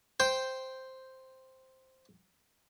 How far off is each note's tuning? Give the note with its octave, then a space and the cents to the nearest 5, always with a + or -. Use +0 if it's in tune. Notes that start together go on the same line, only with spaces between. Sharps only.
C5 +0 G5 +0